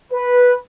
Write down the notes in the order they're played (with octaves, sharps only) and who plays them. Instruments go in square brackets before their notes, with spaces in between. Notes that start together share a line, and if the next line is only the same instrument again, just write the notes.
[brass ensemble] B4